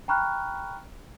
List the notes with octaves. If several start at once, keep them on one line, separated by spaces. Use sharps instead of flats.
G5 A#5 B5 C#6 F6 F#6